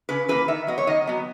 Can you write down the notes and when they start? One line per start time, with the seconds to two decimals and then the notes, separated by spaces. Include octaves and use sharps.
0.09 C#3 B4
0.28 E3 A#3 B4
0.48 D#3 E5
0.67 F#3 B3 D#5
0.78 C#5
0.87 D#3 D#5
1.07 F#3 B3